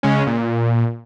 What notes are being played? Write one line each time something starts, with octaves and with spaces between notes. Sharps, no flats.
C#3 G#3 C#4
A#2